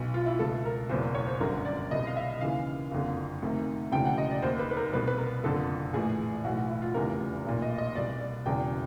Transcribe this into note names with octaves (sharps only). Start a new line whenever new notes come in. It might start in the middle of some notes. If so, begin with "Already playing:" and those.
Already playing: B1 B2
F4
E4
C#2 B2 A4
A#4
F#1 E2 B2 C5
C#5
C5
G1 F#2 D3 A#4
D5
C2 B2 D#5
F5
E5
D#2 C#3 E3 F5
F#1 F2 D3
D2 C3 D#3
E1 D2 C#3 E3 G5
F#5
D#5
D5
D#2 D#3 C5
B4
B4
A#4
C2 B2 B4
B4
A#4
F#1 F2 D3 A4
A#1 A2 E3 G#4
B1 A2 E3 F#4
F#4
E4
F4
F1 E2 C#3 E3 A#4
B1 A#2
D#5
D#5
C2 B2 D5
D5
E1 E2 C#3 E3 G5